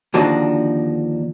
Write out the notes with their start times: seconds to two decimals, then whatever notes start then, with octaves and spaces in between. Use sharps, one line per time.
0.14 D#2 D3 F3 D4 D#4 F#4